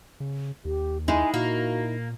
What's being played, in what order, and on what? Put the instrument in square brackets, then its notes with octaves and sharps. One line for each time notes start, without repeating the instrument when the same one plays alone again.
[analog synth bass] C#3
[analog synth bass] D#2 [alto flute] G4
[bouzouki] G#3 [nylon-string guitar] D#4 E4 [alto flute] G#5
[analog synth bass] A#2 [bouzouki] A#3 [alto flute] F#4